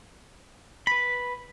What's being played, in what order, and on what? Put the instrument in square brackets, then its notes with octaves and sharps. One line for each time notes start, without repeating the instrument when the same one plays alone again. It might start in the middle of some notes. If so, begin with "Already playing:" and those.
[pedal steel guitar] B4 B5